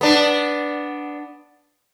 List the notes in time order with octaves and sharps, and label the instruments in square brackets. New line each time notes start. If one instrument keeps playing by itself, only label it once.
[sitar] B3 D4